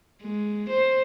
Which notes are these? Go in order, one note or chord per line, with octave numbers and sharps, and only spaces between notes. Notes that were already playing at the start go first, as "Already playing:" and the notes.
G#3
C5